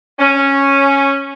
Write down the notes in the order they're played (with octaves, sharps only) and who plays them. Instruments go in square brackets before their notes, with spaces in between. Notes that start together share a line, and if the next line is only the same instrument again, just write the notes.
[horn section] C#4